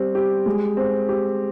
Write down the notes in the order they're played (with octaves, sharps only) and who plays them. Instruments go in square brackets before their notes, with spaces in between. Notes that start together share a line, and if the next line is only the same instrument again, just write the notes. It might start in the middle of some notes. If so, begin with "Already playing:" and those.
Already playing: [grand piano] G3 C4
G4
G#3
C4
G4